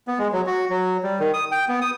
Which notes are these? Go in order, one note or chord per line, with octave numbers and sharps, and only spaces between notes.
B3
G#3
F#3
F#4
F#3
G3
D#3
D#6
G5
B3
D#6